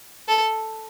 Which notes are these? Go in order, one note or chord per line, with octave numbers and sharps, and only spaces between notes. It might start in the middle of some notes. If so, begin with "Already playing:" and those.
A4